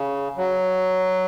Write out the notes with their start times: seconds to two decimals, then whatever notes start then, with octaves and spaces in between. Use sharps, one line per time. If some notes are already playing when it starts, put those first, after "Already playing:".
Already playing: C#3
0.37 F#3